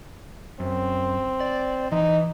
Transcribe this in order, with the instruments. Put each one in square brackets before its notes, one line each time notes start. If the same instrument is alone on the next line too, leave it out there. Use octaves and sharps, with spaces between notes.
[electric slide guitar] F#2 [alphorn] C4
[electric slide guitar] D5
[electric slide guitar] E3 [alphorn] D#4